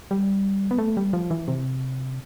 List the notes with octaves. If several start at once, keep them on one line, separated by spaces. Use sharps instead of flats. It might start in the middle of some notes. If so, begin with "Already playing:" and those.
G3
B3
A3
G3
F3
E3
C3